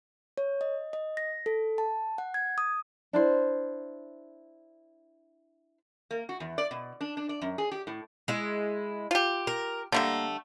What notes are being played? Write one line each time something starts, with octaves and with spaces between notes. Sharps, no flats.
C#5
D#5
D#5
A#6
A4
A5
F#5
G#6
D#6
D4 E4 C5
A#3
F#4
E2
D5
B2
D4
D4
D5
F#2
G#4
G4
A2
G#3 E4
F4 G4
A#4
D3 G3 A3 A#3